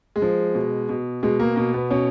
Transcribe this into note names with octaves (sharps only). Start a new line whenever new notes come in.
G#3
F3
B2
B2
B2 G#3
A#3
B2 A#3
B3
B2 C#4